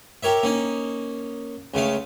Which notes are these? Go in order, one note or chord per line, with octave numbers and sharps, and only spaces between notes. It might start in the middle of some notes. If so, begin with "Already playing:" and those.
G4 A#4 C#5 E5
A#3 C#4 D#4
C#2 C#3 A3 F5